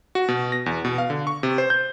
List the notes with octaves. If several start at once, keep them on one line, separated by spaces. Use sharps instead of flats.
F#4
B2
A#6
E2
B2
F5
D3
C#6
C3
C5
G6